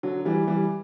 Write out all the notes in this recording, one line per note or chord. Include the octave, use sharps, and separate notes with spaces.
D3 F#3
E3 G3
E3 G3